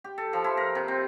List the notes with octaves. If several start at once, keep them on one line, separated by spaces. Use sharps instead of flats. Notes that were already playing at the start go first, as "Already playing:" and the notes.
G4
A4
F3
E4
A#4
C3
C4